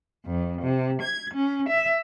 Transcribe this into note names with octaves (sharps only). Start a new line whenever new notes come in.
F2
C3
G#6
C#4
E5